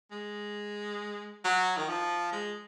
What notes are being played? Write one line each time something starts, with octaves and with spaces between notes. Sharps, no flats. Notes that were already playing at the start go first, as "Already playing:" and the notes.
G#3
F#3
D#3
F3
G#3